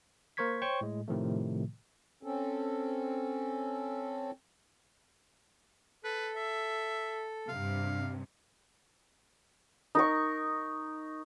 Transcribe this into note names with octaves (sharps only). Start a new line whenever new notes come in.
A#3 A#4 C5 C#6 G#6 B6
C5 C#5 G5 C#6 G6
A2 G#3
A2 C3 D#3 F3 A3
C4 C#4 A4
A4 B4
E5
G2 C3 F5
D#4 A#4 C#6